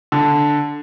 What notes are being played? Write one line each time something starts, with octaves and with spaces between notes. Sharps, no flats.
D3